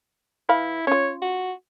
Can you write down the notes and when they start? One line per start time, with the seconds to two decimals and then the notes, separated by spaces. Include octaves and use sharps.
0.49 E3 E4 F5 B5
0.87 C#4 F4 C#5
1.22 F#4